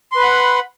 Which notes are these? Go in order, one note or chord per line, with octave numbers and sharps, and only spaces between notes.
B4 F#5 B5 C6